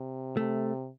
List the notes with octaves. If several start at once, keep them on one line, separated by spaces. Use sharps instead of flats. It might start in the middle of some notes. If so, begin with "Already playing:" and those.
Already playing: C3
C3 A3